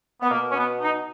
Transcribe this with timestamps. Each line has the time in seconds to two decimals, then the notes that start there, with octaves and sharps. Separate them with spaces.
0.22 B3
0.30 B2 A#3
0.50 C#4
0.56 B3
0.81 D#4